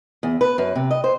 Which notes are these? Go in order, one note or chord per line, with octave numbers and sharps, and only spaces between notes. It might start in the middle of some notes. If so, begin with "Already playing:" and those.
E2
B4
F#2
C3
D#5
C5